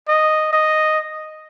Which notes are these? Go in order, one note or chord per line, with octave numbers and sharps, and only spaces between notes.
D#5
D#5